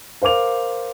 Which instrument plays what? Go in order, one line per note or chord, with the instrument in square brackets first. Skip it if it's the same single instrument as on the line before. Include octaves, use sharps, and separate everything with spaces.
[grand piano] A#4 C5 F5 D6 F7